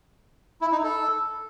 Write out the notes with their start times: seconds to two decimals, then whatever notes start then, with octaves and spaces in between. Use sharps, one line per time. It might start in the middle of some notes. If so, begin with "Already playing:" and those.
0.61 E4
0.72 D#4
0.83 A4